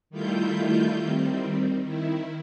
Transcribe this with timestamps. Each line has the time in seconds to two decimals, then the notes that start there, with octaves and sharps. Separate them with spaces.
0.10 D#3 G3 A3 E4 F4 G6
1.01 D#3 G3 C4
1.82 D#3 E4